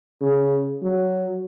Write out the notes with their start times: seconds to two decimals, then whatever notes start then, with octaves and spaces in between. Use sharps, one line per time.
0.21 C#3
0.83 F#3